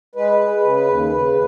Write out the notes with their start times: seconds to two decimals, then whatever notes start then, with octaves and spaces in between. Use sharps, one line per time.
0.15 G#3 B4
0.39 G#3
0.63 C#3
0.87 D#2
1.12 C#3